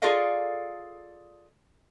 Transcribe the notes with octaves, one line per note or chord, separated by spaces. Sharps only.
F4 G#4 A4 D5 D#5 F5